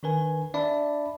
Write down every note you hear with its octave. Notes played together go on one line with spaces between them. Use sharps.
D#3 D4 A#4 B4 G#5
D4 D5 E5 A5 B5